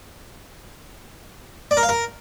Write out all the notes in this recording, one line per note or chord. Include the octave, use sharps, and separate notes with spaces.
D5
A#4
F5
A#4